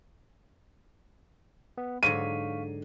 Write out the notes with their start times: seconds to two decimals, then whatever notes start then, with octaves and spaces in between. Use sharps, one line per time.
1.78 B3
2.03 G#2 D3 F#3 F5 C#6 B6 D#7